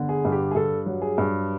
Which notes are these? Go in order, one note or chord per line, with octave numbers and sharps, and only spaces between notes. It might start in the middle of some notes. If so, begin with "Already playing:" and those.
Already playing: G1 D3
G#4
G2
G4
G#4
G2 A4
F#3
G#4
G2